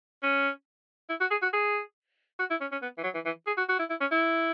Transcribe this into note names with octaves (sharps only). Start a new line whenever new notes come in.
C#4
E4
F#4
G#4
F#4
G#4
F#4
E4
C#4
C#4
B3
E3
F#3
E3
E3
G#4
F#4
F#4
E4
E4
C#4
E4